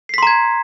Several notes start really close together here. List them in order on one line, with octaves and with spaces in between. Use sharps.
C7 B6 C6 A#5 G#6